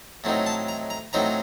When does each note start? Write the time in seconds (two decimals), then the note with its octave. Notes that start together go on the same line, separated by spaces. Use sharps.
0.24 A2 F#3 C4 D#4
0.46 A5
0.68 A#5
0.90 A#5
1.13 A2 F#3 C4 D#4 A#5